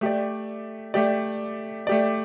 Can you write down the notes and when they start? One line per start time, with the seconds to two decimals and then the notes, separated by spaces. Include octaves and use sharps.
0.01 A3 G4 D5
0.94 A3 G4 D5
1.87 A3 G4 D5